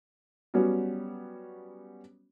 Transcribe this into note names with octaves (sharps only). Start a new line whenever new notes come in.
F#3 G3 B3 C#4 F#4